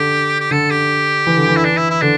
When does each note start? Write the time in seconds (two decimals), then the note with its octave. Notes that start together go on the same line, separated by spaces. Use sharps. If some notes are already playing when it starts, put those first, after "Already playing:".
Already playing: D3 G4
0.40 G4
0.51 D3 A4
0.70 G4
1.27 E3
1.37 D3
1.48 E3
1.56 E4
1.64 D4
1.77 E4
1.90 E4
2.01 D3 D4